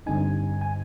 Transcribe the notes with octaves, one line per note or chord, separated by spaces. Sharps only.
G2 D3 G3 C4 D#4 G#5
G#5